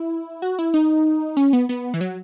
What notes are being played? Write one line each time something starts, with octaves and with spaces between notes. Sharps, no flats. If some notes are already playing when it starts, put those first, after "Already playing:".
Already playing: E4
F#4
E4
D#4
C#4
B3
B3
E3
F#3